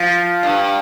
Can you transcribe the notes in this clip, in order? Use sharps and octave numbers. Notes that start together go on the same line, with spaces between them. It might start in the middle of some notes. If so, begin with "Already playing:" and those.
Already playing: F3
G2